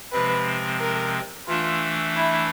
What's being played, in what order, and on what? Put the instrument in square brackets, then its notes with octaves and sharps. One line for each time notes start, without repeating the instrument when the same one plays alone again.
[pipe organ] C3 F3 G#3 C4 [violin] B4
[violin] A#4
[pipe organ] E3 A3 D4 [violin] F4
[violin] E4